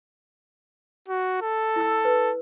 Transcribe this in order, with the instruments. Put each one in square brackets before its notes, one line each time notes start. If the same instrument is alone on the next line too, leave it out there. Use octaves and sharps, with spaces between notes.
[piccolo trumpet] F#4
A4
[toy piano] E4 E6
B4